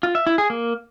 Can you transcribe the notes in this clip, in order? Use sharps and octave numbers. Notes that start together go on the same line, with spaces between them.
F4
E5
E4
G#4
A#3